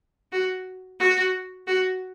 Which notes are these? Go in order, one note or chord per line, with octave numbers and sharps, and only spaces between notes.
F#4
F#4
F#4